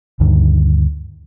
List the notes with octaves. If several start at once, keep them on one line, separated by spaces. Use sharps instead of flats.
D2 G2 D3 D#3